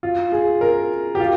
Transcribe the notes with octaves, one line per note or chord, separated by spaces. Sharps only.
F4
G#4
A#4
G4
F4